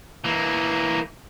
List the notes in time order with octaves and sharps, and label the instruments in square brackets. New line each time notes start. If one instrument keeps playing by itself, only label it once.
[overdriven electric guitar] E3 A#3